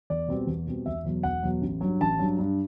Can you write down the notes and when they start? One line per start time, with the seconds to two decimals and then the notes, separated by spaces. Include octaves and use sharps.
0.10 E2 D5
0.28 B2 G3 C4
0.47 E2
0.67 B2 G3 C4
0.86 E1 E5
1.05 E2 B2 F#3
1.23 E1 F#5
1.43 E2 B2 F#3
1.62 A1
1.81 G2 F#3
2.01 A1 A5
2.19 G2 F#3
2.39 G2